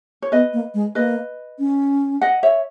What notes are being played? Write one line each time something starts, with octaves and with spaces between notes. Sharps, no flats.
C#5
B3 B4 D#5
A#3
G#3
A#3 B4 D#5
C#4
D#5 F#5
C#5 E5